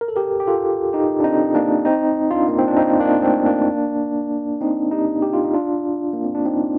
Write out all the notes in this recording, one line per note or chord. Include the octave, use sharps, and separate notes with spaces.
A#4
A4
G4 A#4
G4
F4 A4
D#4 G4
D4
C4 D#4
A#3 D4
C4 D#4
D4 F4
A#3
C4
D4
C4 D#4
A#3 D4
A3 C4
A#3 D4
C4 D#4
D#4 G4
G4
F4
D#4
D4 F4
A#3
C4
D4
C4 D#4